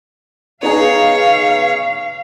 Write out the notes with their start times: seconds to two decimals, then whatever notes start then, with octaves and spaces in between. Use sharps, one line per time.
0.63 B3 D#4 G#4 C#5 F5